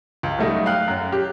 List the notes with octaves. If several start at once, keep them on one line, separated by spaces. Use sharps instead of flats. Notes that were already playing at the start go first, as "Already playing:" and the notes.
C#2
F#3 G3 A3 D#4
F5 G5 F#6
F#2
G4